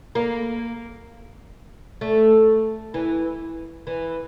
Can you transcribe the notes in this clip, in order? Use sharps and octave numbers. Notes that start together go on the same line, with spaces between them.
A#3
A3
E3
E3